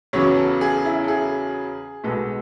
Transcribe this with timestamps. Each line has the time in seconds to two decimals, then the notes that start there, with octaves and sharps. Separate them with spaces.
0.13 E2 C#3 F#3 B3 C#5
0.36 A4
0.61 G#4
0.85 E4
1.04 A4
1.08 G#4
2.04 B1 B2 G#3 B3 A4